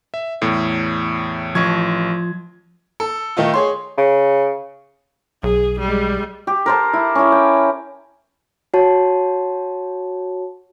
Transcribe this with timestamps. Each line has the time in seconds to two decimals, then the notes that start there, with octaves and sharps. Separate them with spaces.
0.14 E5
0.42 E2 A2
1.55 A1 F3 C#6 G#6
3.00 A4
3.37 D#3 A3 D#4 F4
3.54 G#4 C#5 C6
3.98 C#3
5.43 B1 G#4
5.80 G3 G#3
6.47 G4
6.66 A#4 C5 A5
6.93 E4
7.15 C#4 E4
7.32 G5
8.74 F#4 C#5 A5